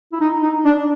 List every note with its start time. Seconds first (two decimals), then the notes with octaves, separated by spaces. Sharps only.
0.13 E4
0.21 D#4
0.42 D#4
0.65 D4